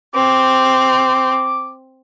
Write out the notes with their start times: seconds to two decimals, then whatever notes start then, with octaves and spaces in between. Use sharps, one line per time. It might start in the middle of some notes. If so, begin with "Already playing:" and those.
0.14 C4 D6